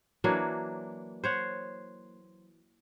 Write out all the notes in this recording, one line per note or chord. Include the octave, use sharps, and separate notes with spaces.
E3 F#3 A#3 D4
C5 C#5 F#5